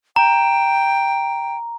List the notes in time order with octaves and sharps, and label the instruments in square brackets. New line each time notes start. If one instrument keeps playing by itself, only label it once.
[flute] G5 [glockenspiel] A#5